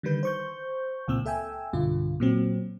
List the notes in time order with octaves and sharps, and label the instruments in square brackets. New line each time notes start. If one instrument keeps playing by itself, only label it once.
[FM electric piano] D3 D#3 G3 B4 G6
C5 C#6 G6
C#2 A#2 C4 E6
A4 E5 G5 G#5 E6
B1 G2 D3 F4
A#2 F#3 C4